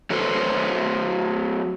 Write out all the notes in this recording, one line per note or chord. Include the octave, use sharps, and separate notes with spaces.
F#3 A3 F#4 A4 B4 C5